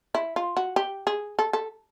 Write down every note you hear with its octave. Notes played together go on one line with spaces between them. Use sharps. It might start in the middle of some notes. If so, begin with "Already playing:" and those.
E4
F4
F#4
G4
G#4
A4
A4